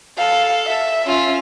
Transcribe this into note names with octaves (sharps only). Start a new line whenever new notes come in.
A4 F5
E5
C#4 F4